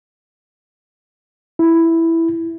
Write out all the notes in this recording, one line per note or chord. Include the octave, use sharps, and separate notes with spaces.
E4